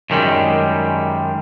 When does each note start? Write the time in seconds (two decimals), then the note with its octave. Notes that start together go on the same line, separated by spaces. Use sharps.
0.10 F#2 D#3 G3 G#3